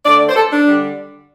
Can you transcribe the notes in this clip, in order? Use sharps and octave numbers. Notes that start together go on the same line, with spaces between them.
D3 A3 D5
C5
A4
D4
D3 G3